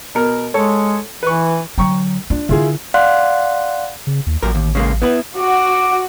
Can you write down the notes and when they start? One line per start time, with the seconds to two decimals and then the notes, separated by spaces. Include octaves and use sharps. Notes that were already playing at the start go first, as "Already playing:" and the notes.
0.15 B2 A#4
0.54 G#3 A4 C#5
1.23 E3 B4 C#6
1.78 D3 F#3 G5 A#5 C#6
2.30 D4 F4
2.49 D3 D#3 E4 F4 G#4
2.94 D5 F5 F#5 C6 F#6
4.07 C#3
4.26 D#2
4.43 A1 F#2 A#2 A#4
4.55 D#2
4.75 C#3 G#3 A#3
5.02 B3 E4 B4
5.37 F#4 D6